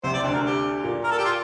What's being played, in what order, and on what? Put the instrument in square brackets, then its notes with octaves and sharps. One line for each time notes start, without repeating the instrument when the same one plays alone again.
[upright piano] C2 C3 [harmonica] C5
[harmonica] D5
[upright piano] D2 D3 [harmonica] C5
[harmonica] A#4
G4
[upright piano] A#2 A#3
[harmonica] A#4
A4
G4
F4